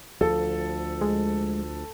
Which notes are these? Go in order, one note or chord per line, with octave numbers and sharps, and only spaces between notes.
D2 F3 A4
G#3